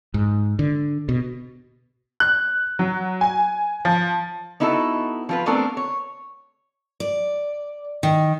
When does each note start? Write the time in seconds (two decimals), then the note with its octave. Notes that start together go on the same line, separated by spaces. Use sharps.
0.14 G#2
0.59 D3
1.09 B2
2.20 F#6
2.79 F#3
3.21 G#5
3.85 F3
4.60 B3 D#4 E4 F#4 A4
5.29 F3 F4 B4
5.46 A3 B3 C4 D4 A4 A#4
5.77 C#5
7.00 D5
8.03 D#3